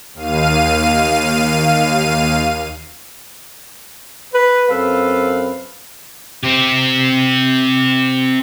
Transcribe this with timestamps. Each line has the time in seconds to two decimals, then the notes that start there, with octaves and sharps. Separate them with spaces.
0.14 D#2 F5 D#7
4.34 B4
4.69 F#2 C4 A4 B4 F5
6.44 C4 G4